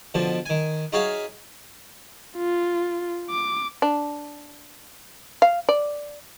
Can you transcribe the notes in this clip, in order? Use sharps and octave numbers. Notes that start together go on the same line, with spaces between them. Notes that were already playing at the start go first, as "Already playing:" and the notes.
B2 D3 F3
D#3 G#5
D#4 F#4 G#4 C#5 E5 F5
F4
D6
D4
F5
D5